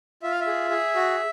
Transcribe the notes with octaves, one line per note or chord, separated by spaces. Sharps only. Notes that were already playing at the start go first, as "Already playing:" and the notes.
F4 E5
F5
E5
G#4
G#4
F#4